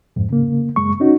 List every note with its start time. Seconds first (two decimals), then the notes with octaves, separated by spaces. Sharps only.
0.16 F2 G#2
0.30 C#3 A#3
0.76 F#2 G#3 C#6
1.00 C#4 D#4 F#4